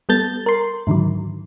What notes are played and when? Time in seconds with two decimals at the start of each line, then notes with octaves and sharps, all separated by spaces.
0.09 G3 B3 A4 G6 A6
0.46 A#4 C6
0.87 G#2 D3 D#3 F#3